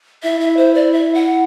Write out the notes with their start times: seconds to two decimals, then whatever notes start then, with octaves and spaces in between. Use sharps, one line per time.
0.23 E4 E5
0.40 E5
0.57 C5
0.74 D5
0.92 E5
1.15 F#5